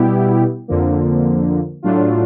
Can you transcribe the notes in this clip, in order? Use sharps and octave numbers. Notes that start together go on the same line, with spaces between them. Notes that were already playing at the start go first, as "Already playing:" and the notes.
Already playing: B2 G3 B3 E4 G4
F2 D3 F3 A#3
A2 F#3 A3 D4 F4